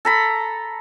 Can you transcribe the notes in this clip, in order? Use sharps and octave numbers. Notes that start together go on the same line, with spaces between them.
A4 A#5 B5